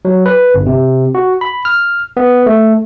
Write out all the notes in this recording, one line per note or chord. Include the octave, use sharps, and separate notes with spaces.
F#3
B4
G1
C3
F#4
B5
F6
B3
A3